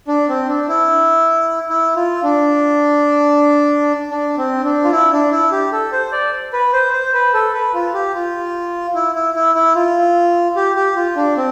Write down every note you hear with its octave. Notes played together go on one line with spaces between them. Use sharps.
D4
C4
D4
E4
E4
F4
D4
D4
C4
D4
F4
E4
D4
E4
G4
A4
C5
D5
B4
C5
C5
B4
A4
B4
F4
G4
F4
E4
E4
E4
E4
F4
G4
G4
F4
D4
C4